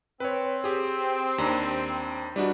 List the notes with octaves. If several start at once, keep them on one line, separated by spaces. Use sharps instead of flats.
C4 B4 C#5
G4 G#4
D#2 D4 A#5
E3 G3 D4 D#4 F#4 B4